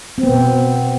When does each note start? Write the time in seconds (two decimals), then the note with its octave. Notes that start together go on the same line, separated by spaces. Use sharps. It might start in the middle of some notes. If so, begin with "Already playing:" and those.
0.18 C4
0.23 B3
0.29 B2
0.34 B3